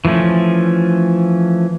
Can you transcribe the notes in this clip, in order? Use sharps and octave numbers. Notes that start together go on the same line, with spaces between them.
E3 F3 A3 C#4